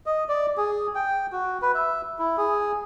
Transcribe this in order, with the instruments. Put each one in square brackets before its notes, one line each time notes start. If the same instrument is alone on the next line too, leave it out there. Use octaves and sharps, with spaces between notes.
[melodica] D#5
D5
G#4
G5
F#4
B4
E5
E4
G#4